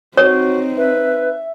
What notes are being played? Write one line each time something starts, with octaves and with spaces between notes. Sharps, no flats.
C4 D#4 F#4 C#5
B4 E5